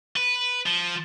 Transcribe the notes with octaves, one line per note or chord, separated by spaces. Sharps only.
B4
F3